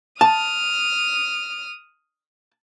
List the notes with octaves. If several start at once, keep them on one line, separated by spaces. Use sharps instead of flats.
A5 D#6 F6